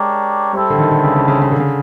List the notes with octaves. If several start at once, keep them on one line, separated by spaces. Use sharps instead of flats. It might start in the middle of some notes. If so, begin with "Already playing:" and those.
Already playing: G#3 D4 G4 A#4 C#5
G3 C4 E4 A4
D3
D#3
D3
C#3
C#3
C#3
C#3
D3
C#3